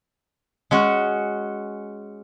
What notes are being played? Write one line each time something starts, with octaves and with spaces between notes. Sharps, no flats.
G#3 C#4 F#4